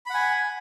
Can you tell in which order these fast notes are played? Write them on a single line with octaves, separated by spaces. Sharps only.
B5 F#5 G#5